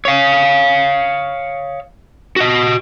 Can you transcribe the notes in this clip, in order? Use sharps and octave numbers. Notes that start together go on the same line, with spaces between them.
C#5 F5
F#4 D#5